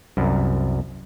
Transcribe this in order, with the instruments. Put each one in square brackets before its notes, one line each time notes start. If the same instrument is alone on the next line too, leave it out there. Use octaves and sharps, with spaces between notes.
[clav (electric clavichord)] C2 F#2